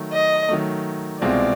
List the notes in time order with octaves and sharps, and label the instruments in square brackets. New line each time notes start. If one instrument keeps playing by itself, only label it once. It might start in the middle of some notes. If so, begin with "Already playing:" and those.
Already playing: [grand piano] D#3 F#3 A3
[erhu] D#5
[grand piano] D#3 F#3 A3
[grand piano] C2 B2 G#3 C4 F4 [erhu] D5